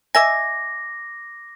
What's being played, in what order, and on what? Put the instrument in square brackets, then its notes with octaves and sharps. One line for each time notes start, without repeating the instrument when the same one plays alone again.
[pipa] D#5 E5 G#5 [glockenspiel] D6 A#6